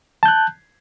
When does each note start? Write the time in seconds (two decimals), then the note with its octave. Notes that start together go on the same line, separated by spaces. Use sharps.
0.23 A5
0.26 G6
0.28 F#6